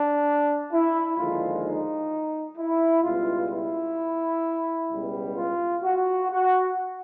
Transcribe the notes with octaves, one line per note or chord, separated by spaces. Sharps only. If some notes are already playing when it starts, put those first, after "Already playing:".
Already playing: D4
E4
D#2 D3 F3 G#3 F4
D#4
E4
C#2 B2 G3 F4
E4
C#2 B2 G3
F4
F#4
F#4